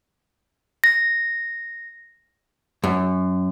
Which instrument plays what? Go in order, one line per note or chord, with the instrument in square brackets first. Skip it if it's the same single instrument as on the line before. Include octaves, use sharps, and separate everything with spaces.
[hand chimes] A#6
[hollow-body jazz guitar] F#2